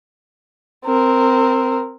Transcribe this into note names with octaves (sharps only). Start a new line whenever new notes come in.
C4 A#4